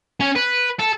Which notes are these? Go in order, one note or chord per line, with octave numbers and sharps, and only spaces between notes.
C#4
B4
A4